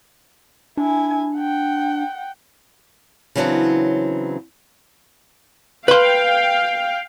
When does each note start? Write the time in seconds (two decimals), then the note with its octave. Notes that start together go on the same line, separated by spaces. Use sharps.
0.77 D4 E4 G#5
1.37 F#5 G5
3.35 C#3 E3 F#3 B3 C4 D4
5.88 B4 F5 G5 C6